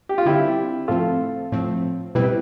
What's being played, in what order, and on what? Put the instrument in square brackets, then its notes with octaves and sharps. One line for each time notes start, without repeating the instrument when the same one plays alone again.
[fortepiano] G4
F4
[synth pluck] D3 G3 C4 [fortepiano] E4 G4
[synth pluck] A2 F3 A3 C4 [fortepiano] F4 A4
[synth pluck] A2 F3 A3 C4
[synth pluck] B2 G3 C4 E4 [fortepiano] G4 B4